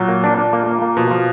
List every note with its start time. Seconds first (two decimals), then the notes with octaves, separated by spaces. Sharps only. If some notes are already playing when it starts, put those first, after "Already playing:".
Already playing: A#2 F#3
0.08 A#3
0.24 D4
0.38 D4
0.53 A#3
0.67 A#3
0.82 A#3
0.97 B2 F3
1.11 F3